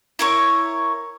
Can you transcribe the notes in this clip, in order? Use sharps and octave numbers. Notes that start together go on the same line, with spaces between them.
E4 A#4 C#5